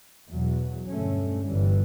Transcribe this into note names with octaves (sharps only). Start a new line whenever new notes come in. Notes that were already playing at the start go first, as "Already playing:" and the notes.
E2 B2 F#3
G2 D3 A3 C#4
G1 G2 E3 G3